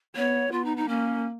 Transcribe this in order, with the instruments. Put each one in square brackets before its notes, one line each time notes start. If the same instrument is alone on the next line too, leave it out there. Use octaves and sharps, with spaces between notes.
[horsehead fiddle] B3 [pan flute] C#5
[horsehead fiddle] B3 [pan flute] F4
[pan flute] D#4
D#4
[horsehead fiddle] A#3 [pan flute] C#4